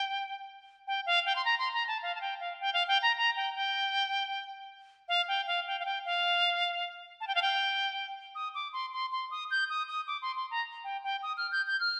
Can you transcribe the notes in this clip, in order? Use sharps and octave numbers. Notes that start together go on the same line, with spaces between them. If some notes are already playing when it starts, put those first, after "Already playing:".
Already playing: G5
G5
F5
G5
C6
A#5
C6
A#5
A5
F5
A5
G5
F5
G5
F5
G5
A#5
A#5
G5
G5
F5
G5
F5
G5
F5
G5
F5
A5
G5
F5
G5
D#6
D6
C6
C6
C6
D#6
G6
D#6
D#6
D6
C6
C6
A#5
G5
G5
D#6
F6
G6
G6
F6